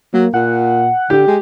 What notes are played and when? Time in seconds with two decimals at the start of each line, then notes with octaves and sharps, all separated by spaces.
0.14 F#3 A#3
0.34 A#2 F#5
1.10 D3 G4 G5
1.27 G#3